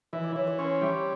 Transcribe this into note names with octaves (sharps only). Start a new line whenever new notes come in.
E3 D#5
D5
E3 C#5
C#5
C#4 C5
G3